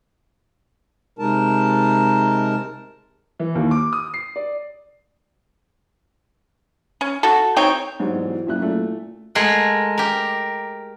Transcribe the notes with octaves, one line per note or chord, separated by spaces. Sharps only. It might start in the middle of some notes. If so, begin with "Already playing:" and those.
C3 G#3 D#4 A#4 A5
E3
D#2
D6
D#6
C7
D5
C#4
F#4 A4
C4 D#4 C#5 G5
G#2 F#3 G3
E2
F#1 A#2 E5 F#6
A#2 A3
G#3 A3 G#4 A#4 F#5
G4 A#4